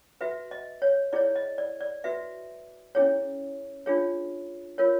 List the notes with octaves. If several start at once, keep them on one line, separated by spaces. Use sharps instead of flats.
F#4 B4 E5
D#5
C#5
E4 G#4 C#5 D5
D#5
D5
D5
F#4 B4 E5
C#4 E4 G#4 C#5
D4 F4 G#4 C#5
F4 A#4 C#5